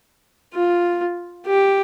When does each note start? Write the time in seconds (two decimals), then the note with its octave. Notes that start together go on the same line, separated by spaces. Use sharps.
0.53 F4
1.47 G4